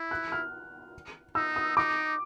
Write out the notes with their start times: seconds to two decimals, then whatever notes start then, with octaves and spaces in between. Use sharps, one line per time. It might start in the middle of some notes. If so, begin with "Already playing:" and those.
Already playing: E4
0.11 F#6
0.32 F6
1.35 D#4 E6
1.56 D#6
1.77 D#4 D6